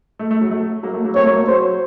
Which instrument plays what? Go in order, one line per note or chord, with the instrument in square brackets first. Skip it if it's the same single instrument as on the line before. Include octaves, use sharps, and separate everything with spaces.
[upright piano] A3
A3
F#3
A3
F#3 A#3
A3
F#3 A#3
[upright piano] A3 C4 [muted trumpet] C#5
[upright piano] F#3 A#3
A3
[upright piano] F#3 [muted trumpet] C5